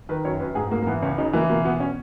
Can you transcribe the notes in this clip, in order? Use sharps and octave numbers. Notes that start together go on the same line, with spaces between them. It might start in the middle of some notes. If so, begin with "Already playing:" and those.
D#3 B4
F#2 C#5
F#2 B4
G#2 G#4
G#2 A#3
A#3
E3 B3
C#2 C#4
C#3 D#4
E3 A#3
B2 A#3
B2 B3
C#4